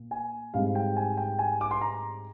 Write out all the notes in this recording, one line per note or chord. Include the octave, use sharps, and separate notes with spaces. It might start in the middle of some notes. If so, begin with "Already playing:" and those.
Already playing: A#2
G#5
G#2 G3 C4 F5
G5
G#5
G5
G#5
D6
C6
A#5